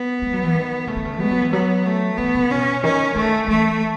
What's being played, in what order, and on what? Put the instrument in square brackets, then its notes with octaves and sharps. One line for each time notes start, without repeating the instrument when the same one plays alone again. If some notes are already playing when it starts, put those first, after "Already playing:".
Already playing: [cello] B3
[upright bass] G#3
F#3
E3
D#3
[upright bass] C#3 [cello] A3
[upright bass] D#3
C#3
[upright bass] G#3 [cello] B3
[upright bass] F#3
E3
[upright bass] F#3 [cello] B3
[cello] A3
[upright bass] E3 [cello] B3
[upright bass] C#3
[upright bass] B2 [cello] C#4
[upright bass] D#3 [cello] C#4
[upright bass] D#3 [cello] A3
[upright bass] E3 [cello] A3